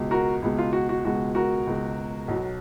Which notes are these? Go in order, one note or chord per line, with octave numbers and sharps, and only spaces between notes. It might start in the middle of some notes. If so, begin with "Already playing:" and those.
Already playing: C#2 B2 G#3
F#4 A#4
C#2 B2 G#3
F4
F#4
F#4
C#2 B2 G#3 F#4
F#4 A#4
C#2 B2 G#3
B1 B2 F#3